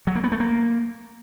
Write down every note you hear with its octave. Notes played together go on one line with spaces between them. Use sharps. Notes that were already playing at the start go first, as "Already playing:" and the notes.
F#3
A#3
B3
A3
A#3